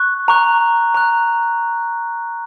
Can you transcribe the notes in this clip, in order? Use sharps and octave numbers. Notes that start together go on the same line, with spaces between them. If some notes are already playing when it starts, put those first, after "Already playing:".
Already playing: C#6 F#6
A#5 C#6 F#6
A#5 C#6 F#6